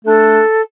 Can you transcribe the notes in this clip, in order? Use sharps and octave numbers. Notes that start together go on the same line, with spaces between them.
A3 D4 A4